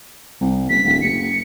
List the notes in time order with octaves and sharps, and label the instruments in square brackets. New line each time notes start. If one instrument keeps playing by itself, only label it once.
[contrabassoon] C2
[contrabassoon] F#1 [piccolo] B6
[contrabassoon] D1
[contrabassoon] F#1 [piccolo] C#7